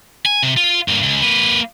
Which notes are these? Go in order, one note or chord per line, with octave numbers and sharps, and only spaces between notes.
G#5
C3
F4
G2 A#3
C#2
A#3 B4